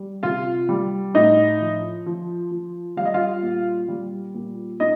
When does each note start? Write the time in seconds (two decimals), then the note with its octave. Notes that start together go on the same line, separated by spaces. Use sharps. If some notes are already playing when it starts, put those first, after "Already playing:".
Already playing: G3
0.23 C3 F4 F5
0.69 G3
1.14 A2 D#4 D#5
1.61 F3
2.06 F3
2.51 F3
2.97 G3 F5
3.05 D#5
3.14 F4 F5
3.43 A#2
3.88 G3
4.35 A#2
4.80 A#2 D#4 D#5